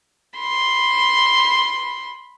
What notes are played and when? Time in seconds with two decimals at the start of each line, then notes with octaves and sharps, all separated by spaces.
0.39 B5 C6